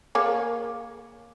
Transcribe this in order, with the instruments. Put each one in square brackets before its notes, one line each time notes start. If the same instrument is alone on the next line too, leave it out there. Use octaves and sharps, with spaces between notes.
[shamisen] A#3 G#4 C#5